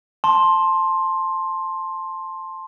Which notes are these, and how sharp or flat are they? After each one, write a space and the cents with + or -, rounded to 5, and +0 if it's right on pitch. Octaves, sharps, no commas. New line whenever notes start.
A5 +0 C6 +10